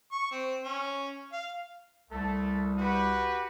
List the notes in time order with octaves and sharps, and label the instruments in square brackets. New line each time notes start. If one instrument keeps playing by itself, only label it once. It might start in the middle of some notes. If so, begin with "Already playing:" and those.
[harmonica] C#6
C4
C#4
F5
[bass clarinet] C2 [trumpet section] A3 A4
[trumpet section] F#4 G4 B4